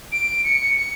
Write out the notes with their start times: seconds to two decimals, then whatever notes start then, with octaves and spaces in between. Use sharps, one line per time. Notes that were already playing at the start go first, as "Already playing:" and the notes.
0.12 D7
0.44 C#7
0.77 C#7